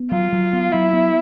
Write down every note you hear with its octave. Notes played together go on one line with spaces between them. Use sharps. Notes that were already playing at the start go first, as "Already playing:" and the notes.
Already playing: B3
F#3 F4
F#3
B3
F#3 E4
B3